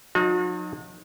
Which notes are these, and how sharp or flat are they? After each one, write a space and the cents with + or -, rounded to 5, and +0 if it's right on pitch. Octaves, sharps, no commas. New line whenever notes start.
F#3 -40 D#4 -20 F#4 -45